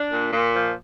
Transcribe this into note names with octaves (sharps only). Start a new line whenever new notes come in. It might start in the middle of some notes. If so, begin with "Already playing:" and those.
Already playing: D4
A#2
A#2
F3